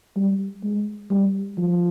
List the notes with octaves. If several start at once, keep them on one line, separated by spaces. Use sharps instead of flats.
G3
G#3
G3
F3